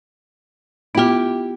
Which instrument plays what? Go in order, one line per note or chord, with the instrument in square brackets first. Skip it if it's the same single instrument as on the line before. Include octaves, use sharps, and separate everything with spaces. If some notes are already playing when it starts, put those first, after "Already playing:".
[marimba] B3 F4 [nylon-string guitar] E4 G4